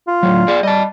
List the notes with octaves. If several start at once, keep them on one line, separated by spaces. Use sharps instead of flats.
F4
A2 F#3
G#4 D5
G3 D#5 A5